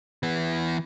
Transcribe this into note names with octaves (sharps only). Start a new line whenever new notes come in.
E3 B3